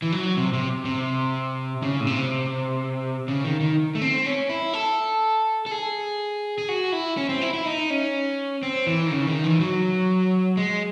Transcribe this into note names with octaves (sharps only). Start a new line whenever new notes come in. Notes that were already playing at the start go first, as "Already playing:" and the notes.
E3
F#3
C3
C3
C3
C#3
A2
C3
C#3
D#3
D#3
A3
C4
C#4
E4
A4
A4
G#4
G#4
F#4
E4
C#4
C4
E4
E4
D#4
C#4
C4
E3
D#3
C#3
D#3
E3
F#3
G#3